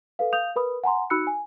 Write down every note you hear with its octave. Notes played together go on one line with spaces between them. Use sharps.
A4 B4 F5
F5 D#6 G6 F7
A#4 B4 B5 D#6
F#5 G#5 A#5 C6
D#4 F#4 B5 E6 F#6 C#7
G#5